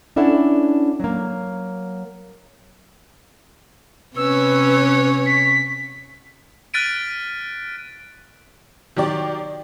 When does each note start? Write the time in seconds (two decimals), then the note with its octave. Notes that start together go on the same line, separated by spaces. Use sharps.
0.16 C#4 D4 E4 A4 F#5
1.00 F#3 A#3
4.16 C3 C#4 B4 C#5 E6
5.26 B6
6.74 F6 F#6 A6 B6 D7 D#7
8.97 D#3 F#3 G4 D5